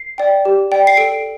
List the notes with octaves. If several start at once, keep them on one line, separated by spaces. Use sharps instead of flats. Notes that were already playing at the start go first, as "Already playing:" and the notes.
Already playing: C7
D5 G5
G4
D5 G5
C7
A4 D7